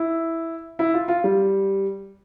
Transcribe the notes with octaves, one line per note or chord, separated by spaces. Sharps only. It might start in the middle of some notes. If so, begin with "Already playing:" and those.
Already playing: E4
E4
F4
F4
G3